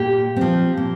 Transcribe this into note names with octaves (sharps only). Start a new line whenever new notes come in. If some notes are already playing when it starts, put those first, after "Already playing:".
Already playing: A#2 G4
F3 C4
A#2